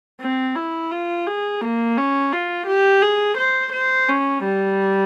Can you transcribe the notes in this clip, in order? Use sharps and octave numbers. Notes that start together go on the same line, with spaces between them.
C4
E4
F4
G#4
A#3
C#4
F4
G4
G#4
C5
C5
C#4
G3